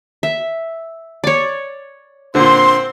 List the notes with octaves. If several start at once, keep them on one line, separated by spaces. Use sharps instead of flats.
E5
C#5 D5
A#2 D3 C4 C6